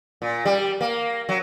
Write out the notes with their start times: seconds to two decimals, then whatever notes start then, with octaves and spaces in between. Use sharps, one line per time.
0.22 A#2
0.45 G3
0.81 A#3
1.29 F#3